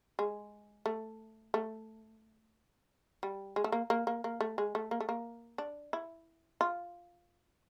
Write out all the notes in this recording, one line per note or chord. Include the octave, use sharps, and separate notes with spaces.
G#3
A3
A3
G3
G#3
A3
A#3
A#3
A#3
A#3
A3
G#3
A3
A#3
A3
A#3
D4
E4
F4